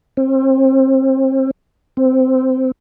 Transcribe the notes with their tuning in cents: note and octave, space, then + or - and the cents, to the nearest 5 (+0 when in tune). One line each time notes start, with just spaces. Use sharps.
C4 +30
C4 -10